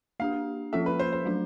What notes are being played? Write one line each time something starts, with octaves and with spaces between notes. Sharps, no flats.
A#3 D4 G4 F5
F3 A#3 C#4 F4 A4 E5
B4
C5
C5
F#3 A3 D4 F#4